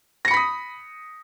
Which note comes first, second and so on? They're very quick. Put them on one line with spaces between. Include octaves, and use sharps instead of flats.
A#6 C#7 B5 B6 D#6